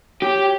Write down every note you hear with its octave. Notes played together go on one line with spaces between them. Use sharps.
G4 C#5